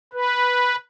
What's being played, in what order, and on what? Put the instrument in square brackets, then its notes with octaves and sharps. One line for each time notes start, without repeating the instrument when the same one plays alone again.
[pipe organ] B4